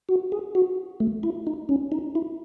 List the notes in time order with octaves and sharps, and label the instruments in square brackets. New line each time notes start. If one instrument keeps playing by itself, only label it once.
[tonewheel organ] F#4
G#4
F#4
A3
E4
D#4
C#4
D#4
E4